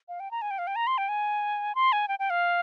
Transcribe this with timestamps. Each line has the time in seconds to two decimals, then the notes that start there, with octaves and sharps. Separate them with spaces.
0.09 F5
0.20 G5
0.31 A#5
0.42 G#5
0.51 G5
0.58 F5
0.67 G5
0.76 A#5
0.87 C6
0.98 G5
1.09 G#5
1.75 C6
1.92 G#5
2.08 G5
2.19 G5
2.30 F5